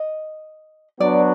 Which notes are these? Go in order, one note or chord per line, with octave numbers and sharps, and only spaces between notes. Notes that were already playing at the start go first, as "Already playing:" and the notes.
Already playing: D#5
F#3 B3 D4 F#4 D5